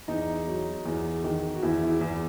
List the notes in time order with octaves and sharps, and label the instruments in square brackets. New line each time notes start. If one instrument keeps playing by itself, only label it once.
[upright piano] E2 D#4
F#3
E2
D#3
F#4
E2 E4
E4
E2